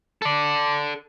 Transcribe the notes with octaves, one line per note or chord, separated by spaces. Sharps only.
A4 D5